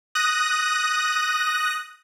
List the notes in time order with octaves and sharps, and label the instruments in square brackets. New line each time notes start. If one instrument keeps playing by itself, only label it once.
[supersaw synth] D#6 F#6 A#6